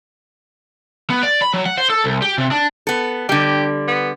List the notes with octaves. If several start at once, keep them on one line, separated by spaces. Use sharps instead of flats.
B3
D5
B5
F#3
F#5
C5
A4
C2
G4
C3
D4
B3 A4
D3 G3 G4
B3